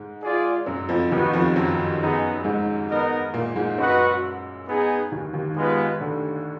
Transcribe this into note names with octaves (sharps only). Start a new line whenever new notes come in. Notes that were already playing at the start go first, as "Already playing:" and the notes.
Already playing: G#2 G#3
F4 G#4 D5
F#2 F#3
F2 F3
D#2 D#3 B3 D#4 F#4
F2 F3
F#2 F#3
B3 D#4 G#4
G#2 G#3
B3 D#4 A#4 D#5
A#2 A#3
G#2 G#3
F#2 F#3 F#4 B4 D#5 F#5
B3 D#4 G#4
D#2 D#3
D#2 D#3
G#3 B3 F4 B4
D2 D3